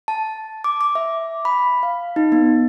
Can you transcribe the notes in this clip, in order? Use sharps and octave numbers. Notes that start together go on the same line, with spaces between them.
A5
D6
D6
E5
B5
F5
D#4
B3